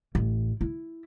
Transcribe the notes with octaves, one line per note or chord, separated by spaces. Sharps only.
A1
E4